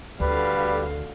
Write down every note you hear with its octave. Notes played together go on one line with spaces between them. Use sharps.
D2 D3 G3 F#4 B4 F5